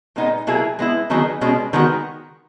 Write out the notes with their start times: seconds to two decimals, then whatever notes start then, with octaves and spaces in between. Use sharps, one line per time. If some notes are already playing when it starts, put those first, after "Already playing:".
0.16 A#2 G#3 B3 D#4
0.47 B2 F#3 A#3 E4 G#4
0.79 G#3 B3 E4
1.10 D#3 F#3 B3 D#4 G#4
1.41 B2 G#3 C#4
1.73 D#3 G#3 B3 F#4